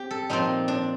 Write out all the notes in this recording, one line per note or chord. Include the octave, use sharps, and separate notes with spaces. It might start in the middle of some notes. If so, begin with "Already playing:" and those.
Already playing: C4 G4
A4
A#2 F3 C4 D#4
D4